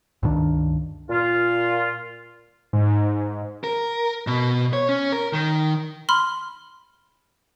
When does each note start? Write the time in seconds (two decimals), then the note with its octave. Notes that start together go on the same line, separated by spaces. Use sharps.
0.23 C#2 G2 D#3 D4
1.10 A#2 F4
2.73 G#2
3.64 A#4
4.27 B2
4.73 C#5
4.89 C#4
5.12 A#4
5.33 D#3
6.09 B5 C6 F6